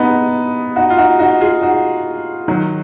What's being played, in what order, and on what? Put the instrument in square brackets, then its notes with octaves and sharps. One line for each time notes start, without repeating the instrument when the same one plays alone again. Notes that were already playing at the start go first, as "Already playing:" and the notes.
Already playing: [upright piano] B3 D#4
D#4 F#4
F4
D#4 F#4
D#4 F#4
F4 G#4
D#4 F#4
D#3 F#3